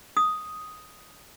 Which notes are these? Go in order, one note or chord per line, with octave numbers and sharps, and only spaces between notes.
D#6